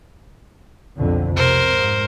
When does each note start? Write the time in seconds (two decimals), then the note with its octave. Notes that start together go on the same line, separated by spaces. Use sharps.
0.99 B1 F2 D3
1.36 C3 A#4 C5
1.74 G#2